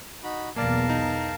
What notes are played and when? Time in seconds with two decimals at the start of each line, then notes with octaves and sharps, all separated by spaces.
0.23 D#4 F#4 B5
0.56 B1 E2 A#3 A#4 D5 F5 A5
0.90 D#4